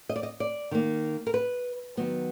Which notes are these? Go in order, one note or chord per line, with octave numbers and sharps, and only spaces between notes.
D#5
D5
D#5
D5
D#3 A#3
A#4
B4
D#3 F#3 B3